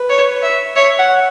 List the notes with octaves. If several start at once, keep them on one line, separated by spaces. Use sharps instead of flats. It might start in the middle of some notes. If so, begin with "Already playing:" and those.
Already playing: B4
C#5
E5
C#5 E5
F#5